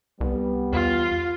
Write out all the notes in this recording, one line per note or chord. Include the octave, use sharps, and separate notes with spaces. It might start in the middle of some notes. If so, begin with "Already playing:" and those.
C2 G3 B3
E2 F4